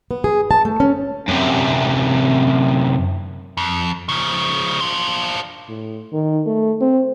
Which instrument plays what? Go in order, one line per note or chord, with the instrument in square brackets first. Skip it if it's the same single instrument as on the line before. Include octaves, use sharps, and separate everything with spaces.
[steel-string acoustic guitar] B3
G#4
A5
A3
C#4
[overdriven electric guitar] F#2 C3
[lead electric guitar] F2
C#3 F3
D4 F4
[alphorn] A2
D#3
A3
C4